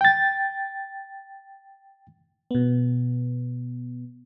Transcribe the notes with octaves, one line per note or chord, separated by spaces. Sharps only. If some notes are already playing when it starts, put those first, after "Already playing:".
G5 A6
B2 B3